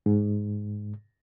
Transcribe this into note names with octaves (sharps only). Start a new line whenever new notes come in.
G#2